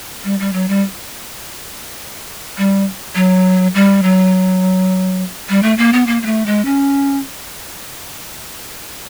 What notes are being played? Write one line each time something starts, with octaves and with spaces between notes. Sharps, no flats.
G3
G3
F#3
G3
G3
F#3
G3
F#3
G3
A3
A#3
B3
A#3
A#3
A3
G#3
C#4